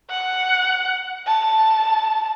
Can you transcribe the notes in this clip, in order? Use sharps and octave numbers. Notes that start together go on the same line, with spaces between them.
F#5
A5